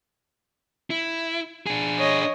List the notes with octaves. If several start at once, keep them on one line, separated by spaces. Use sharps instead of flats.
E4
D4 G#4
C#5 D#5